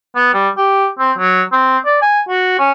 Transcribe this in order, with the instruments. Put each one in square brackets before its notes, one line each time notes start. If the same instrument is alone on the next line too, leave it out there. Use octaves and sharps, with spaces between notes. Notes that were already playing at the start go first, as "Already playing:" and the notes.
[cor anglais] B3
G3
G4
C4
F#3
C4
D5
G#5
F#4
C#4